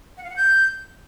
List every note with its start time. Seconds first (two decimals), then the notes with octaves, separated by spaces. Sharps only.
0.17 F#5
0.24 F5
0.30 F#5
0.36 G6